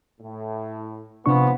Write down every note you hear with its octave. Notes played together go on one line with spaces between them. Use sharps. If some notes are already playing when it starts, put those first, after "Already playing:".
A2
C3 F3 B3 D4 C#6